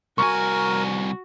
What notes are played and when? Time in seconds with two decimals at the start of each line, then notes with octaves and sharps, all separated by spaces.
0.18 C2 F#4 A#4 G#5 C#6